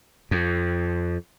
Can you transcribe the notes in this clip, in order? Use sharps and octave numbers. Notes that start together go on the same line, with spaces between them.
F2